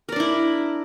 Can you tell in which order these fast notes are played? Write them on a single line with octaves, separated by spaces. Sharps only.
A#4 D5 D4 E4